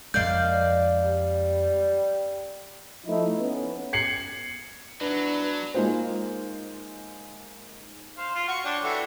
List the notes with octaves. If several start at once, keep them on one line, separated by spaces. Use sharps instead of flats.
F2 D#3 G#3 D5 F5 G6
G3
F3 A3 D#4 E4
B3 C#4
G#6 C7 C#7 F#7
F#3 B3 D4 E4 B4
G#3 A#3 D#4 F4 C5
C5 F5
F4
F#4 C#6
D4 C#5 G5
E3 A3 F#4